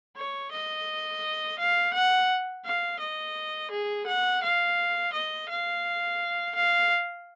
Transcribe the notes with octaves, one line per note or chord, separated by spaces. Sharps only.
C#5
D#5
F5
F#5
F5
D#5
G#4
F#5
F5
D#5
F5
F5